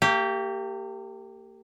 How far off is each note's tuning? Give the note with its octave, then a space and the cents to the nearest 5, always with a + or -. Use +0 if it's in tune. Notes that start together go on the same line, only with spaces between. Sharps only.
A#3 -40 G4 +0